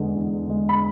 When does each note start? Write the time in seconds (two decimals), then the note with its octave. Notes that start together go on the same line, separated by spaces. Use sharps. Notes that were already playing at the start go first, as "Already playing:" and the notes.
Already playing: E2 D3 G#3
0.15 E2
0.46 D3 G#3
0.69 B5